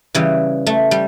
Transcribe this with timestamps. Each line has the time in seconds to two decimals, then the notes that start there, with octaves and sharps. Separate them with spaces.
0.14 C#3 E3 G3
0.67 A3
0.91 G3